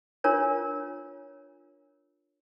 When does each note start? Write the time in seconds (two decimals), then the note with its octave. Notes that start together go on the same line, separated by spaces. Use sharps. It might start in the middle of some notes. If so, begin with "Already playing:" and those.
0.24 D4 F4 A#4 C#5